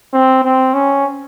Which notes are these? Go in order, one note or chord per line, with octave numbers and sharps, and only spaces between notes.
C4
C4
C#4